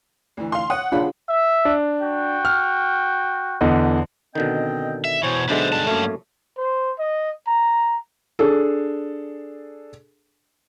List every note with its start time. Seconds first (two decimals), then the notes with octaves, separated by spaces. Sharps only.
0.37 D2 E3
0.52 F5 C6
0.70 C#5 F#5 D#6 F#6
0.92 A#1 C#3 C#4 D4 F4 B5
1.29 E5
1.65 D4
2.02 F#4 G5
2.45 F6
3.61 E2 D3 D#5
4.35 B2 D3 D#3 C4 D#5 G5
5.05 E5
5.23 B2 E3 C5 C#5
5.49 B1 D3 G#3 D4 B4 C5 E5
5.73 G2 F#3 A5
5.87 F#2 A3 A#3 C#4
6.58 C5
6.99 D#5
7.47 A#5
8.39 D4 G#4 A4